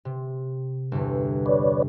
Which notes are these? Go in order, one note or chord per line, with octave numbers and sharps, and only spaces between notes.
C3
G1 E2
B4 C#5 D5